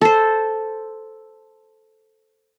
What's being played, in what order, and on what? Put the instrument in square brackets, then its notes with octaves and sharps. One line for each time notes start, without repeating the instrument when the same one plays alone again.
[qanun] A4 C5